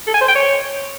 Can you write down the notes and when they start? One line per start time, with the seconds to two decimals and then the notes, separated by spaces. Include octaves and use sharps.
0.07 A4
0.14 G#5
0.21 C5
0.28 G5
0.35 C#5